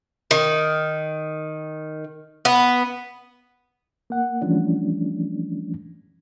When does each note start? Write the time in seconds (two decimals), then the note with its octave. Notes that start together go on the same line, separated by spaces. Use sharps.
0.31 D#3
2.45 B3
4.10 A#3 F#5
4.42 E3 F3 G3 A3 C#4 D4